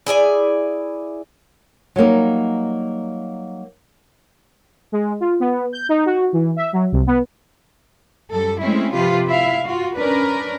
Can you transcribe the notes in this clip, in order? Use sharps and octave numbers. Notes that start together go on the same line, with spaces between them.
E4 G#4 D5 G#5
F#3 G3 A#3 D#4
G#3
F4
B3
G6
D#4
F#4
E3
E5
F#3
C2
B3
F#2 G3 A4
G#3 A3 C4 C#4 E4
C3 F3 F4 G4 B4
E4 E5 F5
F4 F#4
C#4 D4 A#4 B4 D5